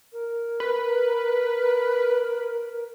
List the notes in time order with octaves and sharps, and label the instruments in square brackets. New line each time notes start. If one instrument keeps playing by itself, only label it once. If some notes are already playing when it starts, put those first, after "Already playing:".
[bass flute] A#4
[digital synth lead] B4